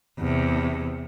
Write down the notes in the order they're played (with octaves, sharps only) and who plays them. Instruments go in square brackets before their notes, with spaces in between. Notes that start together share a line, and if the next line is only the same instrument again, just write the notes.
[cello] E2 C3